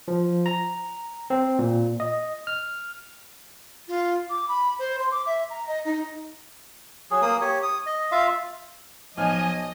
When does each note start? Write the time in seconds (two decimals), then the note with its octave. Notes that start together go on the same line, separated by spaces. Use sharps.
0.08 F3
0.46 A#5
1.30 C4
1.59 A#2
2.00 D#5
2.47 F6
3.88 F4
4.30 D6
4.49 B5
4.79 C5
5.00 C6
5.11 D6
5.26 E5
5.50 A#5
5.68 D#5
5.85 D#4
7.11 F#3 G#4
7.22 A#3 D#6
7.41 G4 C#5
7.63 D#6
7.86 D#5
8.12 F4 E5 F5
9.17 B1 F3 D#5 G#5 F6